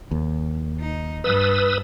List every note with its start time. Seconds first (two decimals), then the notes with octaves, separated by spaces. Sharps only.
0.11 D#2
0.79 D#4
1.24 G2 B4 D#6 E6